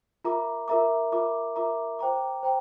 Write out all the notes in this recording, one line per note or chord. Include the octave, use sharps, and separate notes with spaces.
F4 A#4 E5 A#5 D6
F4 A#4 E5 A#5 D6
F4 A#4 E5 A#5 D6
F4 A#4 E5 A#5 D6
C5 G5 A#5 D6
C5 G5 A#5